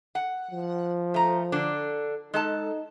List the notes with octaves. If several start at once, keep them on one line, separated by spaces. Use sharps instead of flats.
F#5
F3
A3 A#5
D3 D4
G#3 D#4 A4 A5